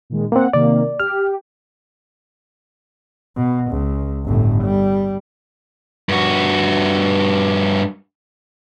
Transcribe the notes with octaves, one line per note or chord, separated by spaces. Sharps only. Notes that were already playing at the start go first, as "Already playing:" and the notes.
A#2 D#3 G#3
A#3 C4 F#5
C3 D#3 A#3 D5
G4 F6
B2
C#2
G1 A2
G3
G2 F#4